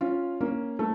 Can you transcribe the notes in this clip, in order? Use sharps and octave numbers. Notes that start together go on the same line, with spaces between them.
C#4 F4
A#3 C#4
A3